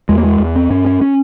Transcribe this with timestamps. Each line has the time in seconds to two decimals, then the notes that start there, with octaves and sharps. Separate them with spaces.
0.09 E2 G#3
0.18 A#3
0.24 G#3
0.39 E2
0.56 C4
0.70 G2 C#4
0.86 C#4
1.01 C#4